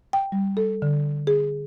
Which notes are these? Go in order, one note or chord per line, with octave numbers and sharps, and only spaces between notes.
G5
G3
A4
D3
G#4